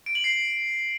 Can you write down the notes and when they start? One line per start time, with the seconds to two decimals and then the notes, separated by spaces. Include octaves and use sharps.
0.06 D7
0.15 F#7
0.24 C7